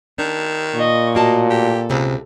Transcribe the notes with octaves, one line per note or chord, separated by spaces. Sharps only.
D#3 D4
A#2 D#5 C#6
A2 A#3 F#4 D#5 A5
G4 A4
C#2 C3